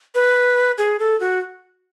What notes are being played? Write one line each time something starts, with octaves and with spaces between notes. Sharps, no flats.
B4
G#4
A4
F#4